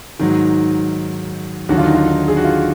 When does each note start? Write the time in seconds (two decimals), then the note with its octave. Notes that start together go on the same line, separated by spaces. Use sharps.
0.19 G#2 D#3 F#3
1.69 D#2 D3 F#3 F#4
1.78 F4
1.86 D#4
1.95 F4
2.07 D#4
2.28 G#4
2.37 F#4
2.44 F4